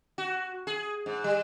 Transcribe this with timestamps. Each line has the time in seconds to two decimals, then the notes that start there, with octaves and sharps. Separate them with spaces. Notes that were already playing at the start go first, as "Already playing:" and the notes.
0.18 F#4
0.67 G#4
1.06 G#2
1.24 G3